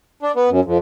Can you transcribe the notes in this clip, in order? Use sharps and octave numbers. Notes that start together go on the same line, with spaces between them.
D4
B3
F#2
F2